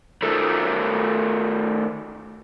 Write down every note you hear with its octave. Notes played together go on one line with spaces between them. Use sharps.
D#3 A3